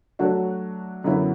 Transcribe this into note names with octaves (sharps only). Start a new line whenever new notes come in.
F#3 A3 D4 F#4
F#2 D3 F#3 B3 E4